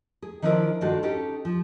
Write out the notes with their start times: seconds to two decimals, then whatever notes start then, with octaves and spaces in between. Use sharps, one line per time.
0.22 G#4
0.42 D#3 F3 D4 E4 A#4 C5
0.81 G2 D#3 G#3 F4 F#4 A4
1.03 C#4 D#4 G4 A4
1.45 F3